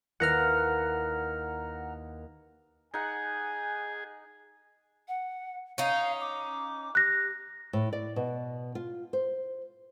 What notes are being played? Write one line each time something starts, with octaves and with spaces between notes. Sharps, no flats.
D#2 E4 B4 F#5 A#5 F6
D#4 G#4 F#5 G#5
F#5
C#4 D#4 F5
D6
G4 F#6 A#6
A2
D5
B2
F4
C5